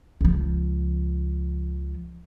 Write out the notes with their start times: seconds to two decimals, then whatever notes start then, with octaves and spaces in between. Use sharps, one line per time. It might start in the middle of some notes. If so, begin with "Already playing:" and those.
0.21 C#2 F3